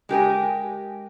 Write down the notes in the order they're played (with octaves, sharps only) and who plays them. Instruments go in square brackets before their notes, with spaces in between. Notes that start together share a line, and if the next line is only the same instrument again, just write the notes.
[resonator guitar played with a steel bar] G#3 G4 A#4 G#5